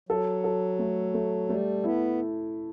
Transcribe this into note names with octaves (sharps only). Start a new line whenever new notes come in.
F#3 A4
A4
A3
A3
G3 A3
B3 E4